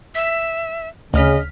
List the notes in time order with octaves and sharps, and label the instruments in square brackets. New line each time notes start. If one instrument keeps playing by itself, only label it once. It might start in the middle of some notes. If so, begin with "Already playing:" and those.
[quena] E5 [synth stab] B6
[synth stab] D2 F6 B6 [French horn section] C#3 [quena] D#5